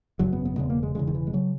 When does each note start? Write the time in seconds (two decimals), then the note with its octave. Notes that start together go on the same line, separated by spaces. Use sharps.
0.19 G#1 F#2 C#3 F#3
0.33 B3
0.45 B3
0.57 E1 E2 C#3 B3
0.70 A#3
0.83 G#3
0.95 E1 E2 C#3 G#3
1.07 D#3
1.15 E3
1.27 G#3
1.33 C#3 F#3